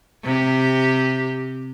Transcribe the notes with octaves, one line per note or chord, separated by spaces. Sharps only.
C3 G4